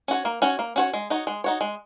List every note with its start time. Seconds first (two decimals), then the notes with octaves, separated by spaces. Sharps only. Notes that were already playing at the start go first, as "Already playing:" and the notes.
0.08 C#4 F#4 C#5
0.25 A#3
0.42 C#4 F#4 C#5
0.59 A#3
0.76 C#4 F#4 C#5
0.93 G#3
1.10 D#4 F#4 C#5
1.27 G#3
1.44 D#4 F#4 C#5
1.61 G#3